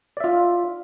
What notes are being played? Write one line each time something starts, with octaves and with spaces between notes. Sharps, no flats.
F4 D5 E5